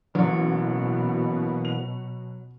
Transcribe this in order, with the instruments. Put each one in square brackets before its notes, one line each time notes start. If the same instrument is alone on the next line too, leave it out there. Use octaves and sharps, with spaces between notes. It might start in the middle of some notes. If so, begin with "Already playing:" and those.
[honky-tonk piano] A1 [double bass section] B2 [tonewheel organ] E3 A#3 B3 [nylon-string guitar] F#3
[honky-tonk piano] F7